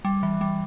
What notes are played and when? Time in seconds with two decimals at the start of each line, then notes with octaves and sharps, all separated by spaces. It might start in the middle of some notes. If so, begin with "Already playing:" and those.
0.05 G3
0.23 E3
0.41 G3